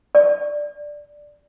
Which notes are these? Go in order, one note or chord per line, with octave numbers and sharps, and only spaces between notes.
D5